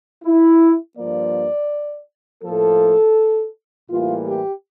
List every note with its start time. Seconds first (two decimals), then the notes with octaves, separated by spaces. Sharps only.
0.23 E4
0.96 G2 F3 A#3 D5
2.43 A2 F3 A#3 A4
3.89 A2 E3 G3 A#3 F4
4.26 G4